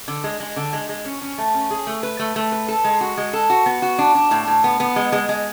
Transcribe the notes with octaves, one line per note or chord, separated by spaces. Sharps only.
D3
G#3
G#3
D3
G#3
G#3
C#4
C#4
A3
C#4
G#4
A3
B4
A3
A3
B4
A4
G#3
F#4
G#3
A4
F#4
B3
F#4
D4
D4
A2
A2
B3
B3
G#3
G#3
G#3